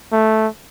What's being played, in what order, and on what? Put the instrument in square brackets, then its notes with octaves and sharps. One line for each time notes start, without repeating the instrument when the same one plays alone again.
[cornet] A3